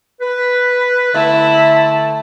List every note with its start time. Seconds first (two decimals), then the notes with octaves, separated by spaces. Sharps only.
0.21 B4
1.14 D3 A3 E4 A5